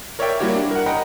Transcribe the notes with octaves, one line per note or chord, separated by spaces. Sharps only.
A#4 C#5 D5 E5 G5
G3 A#3 E4 F#4 G4 C#5
D4
A#4 F#5
D#5 F#5 G5 A#5 B5